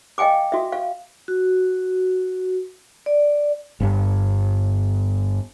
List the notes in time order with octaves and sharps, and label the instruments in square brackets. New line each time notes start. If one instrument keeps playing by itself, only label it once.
[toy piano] D#5 F5 G5 G#5 D6
F#4 E5
F5
[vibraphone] F#4
D5
[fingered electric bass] G1 G2